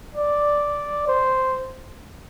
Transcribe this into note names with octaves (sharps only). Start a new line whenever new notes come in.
D5
C5